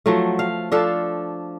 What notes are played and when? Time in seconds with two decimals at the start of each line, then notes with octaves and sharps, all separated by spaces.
0.06 F3 F#3 A3
0.39 F5
0.72 F3 D4 A4 F5